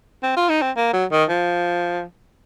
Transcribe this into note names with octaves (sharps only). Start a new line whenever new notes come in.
C4
F4
D#4
C4
A#3
F#3
D#3
F3